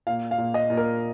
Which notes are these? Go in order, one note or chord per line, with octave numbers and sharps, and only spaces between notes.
A#2 F5
F5
A#2
D#5
A#2
A#4